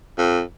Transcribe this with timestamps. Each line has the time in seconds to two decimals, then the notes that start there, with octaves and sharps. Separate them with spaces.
0.18 F2